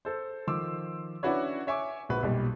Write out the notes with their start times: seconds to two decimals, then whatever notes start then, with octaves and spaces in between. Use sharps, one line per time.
0.05 A4 C5
0.47 D#3 F3 C6 D6 E6
1.23 C#4 D4 E4 F#4 B4 C#5
1.67 C#5 E5 G#5 C#6 D6
2.09 A#1 F#4 B4
2.23 B1 A#2 G3